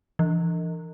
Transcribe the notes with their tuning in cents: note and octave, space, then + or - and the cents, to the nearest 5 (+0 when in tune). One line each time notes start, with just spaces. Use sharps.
E3 +30